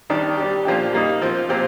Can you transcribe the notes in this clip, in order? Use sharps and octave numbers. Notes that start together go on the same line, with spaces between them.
D#3 G3 D4 G4
G3 D4 G4
A#2 F3 A#3 D4 G4
G3 A#3 D#4
F3 C4 F4
A#2 F3 C4 G4